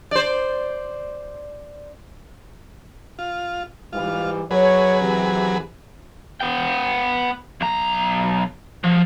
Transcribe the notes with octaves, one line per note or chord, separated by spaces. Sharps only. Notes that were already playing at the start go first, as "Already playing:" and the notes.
C5 D5
F4
G#2 E3 G3 F4
F#3 G#4 B4 C#5
C3 E3
B3 G5
B1 A#5
F3